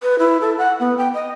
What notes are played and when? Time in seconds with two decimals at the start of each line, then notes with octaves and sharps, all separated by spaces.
0.03 B4
0.19 E4
0.41 A4
0.58 F#5
0.80 B3
0.98 G5
1.14 D#5